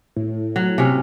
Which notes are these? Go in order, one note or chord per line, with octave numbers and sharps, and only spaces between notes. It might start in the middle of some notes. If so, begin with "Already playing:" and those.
A2
F#3
C3 C#4